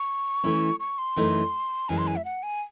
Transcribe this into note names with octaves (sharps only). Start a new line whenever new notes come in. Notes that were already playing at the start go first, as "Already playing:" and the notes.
Already playing: C#6
E3 A3 C#4 E4
C#6
C6
F#2 E3 A3 D#4
F#2 E3 G#3 G#5
C6
G#5
E5
F#5
G#5